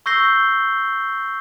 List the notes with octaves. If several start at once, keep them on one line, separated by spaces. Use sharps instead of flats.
C#6 E6 G6 A#6 C7 G7